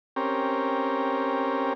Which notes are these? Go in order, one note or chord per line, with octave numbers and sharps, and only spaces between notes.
C4 C#4 G4 A#4